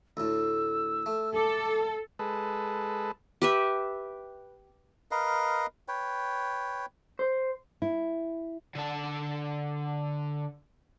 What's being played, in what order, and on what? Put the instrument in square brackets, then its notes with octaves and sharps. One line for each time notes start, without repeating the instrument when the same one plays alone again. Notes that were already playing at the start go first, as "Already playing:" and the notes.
[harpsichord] D2 A2 [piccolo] E6
[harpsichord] A3
[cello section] A4 [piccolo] D6
[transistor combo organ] G#3 A4 B4
[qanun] G4 B4 E5
[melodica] A#4 B4 D#5 F5
B4 C#5 G5
[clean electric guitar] C5
[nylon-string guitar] E4
[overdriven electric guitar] D3 A5